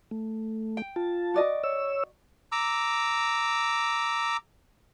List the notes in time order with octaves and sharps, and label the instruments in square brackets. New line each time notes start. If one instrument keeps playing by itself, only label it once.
[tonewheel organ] A3
[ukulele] G5
[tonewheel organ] F4 A5
[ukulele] F#4 D5 D#5
[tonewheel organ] C#5 E6
[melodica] A#5 D6 E6